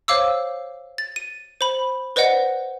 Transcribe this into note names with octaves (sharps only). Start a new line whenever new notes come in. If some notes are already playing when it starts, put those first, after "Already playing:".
C5 C#5 F5 D6 E6
A6
D#7
C5 B5
B4 C5 D5 D#5 F#5